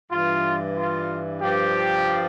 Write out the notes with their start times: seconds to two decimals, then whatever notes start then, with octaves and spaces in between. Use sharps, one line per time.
0.11 G2 E3 F4
0.77 F4
1.42 G2 F3 G4